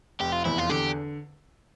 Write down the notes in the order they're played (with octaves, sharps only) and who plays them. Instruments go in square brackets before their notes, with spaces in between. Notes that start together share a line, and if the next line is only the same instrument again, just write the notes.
[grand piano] F1 [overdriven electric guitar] G4
[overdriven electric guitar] F4
[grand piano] E2 [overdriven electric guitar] E4
[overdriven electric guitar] F4
[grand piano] D3 [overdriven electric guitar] G4